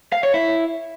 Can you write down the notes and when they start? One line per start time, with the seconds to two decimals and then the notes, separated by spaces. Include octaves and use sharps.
0.12 F5
0.23 C#5
0.34 E4